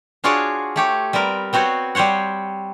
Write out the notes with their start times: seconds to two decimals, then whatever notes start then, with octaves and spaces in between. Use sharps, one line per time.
0.24 D4 F4 F#4 G#4 C#5 D5
0.76 A3 G4 C#5
1.13 G3 B3 C4 A#4
1.53 B3 C4 F#4 C5 C#5
1.95 G3 C4 C5 C#5 F#5